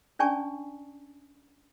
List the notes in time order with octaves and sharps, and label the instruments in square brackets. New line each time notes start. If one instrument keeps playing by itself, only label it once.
[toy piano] C#4 D4 D5 G#5 A5 C#6